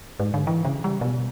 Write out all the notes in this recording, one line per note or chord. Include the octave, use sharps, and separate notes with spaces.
G#2
D3
E3
C#3
G3
B2